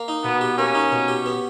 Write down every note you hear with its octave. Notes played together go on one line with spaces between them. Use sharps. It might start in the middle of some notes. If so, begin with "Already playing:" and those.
Already playing: A#3
D#4
B2 B3
G4
A#3 C#4
D#4
B2
G4
B3